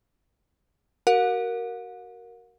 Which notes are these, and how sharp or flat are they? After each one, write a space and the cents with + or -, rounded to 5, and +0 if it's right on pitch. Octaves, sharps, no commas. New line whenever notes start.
F#4 +30 A#4 +0 F#5 -45